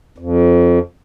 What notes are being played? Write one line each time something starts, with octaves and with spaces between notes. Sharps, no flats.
F2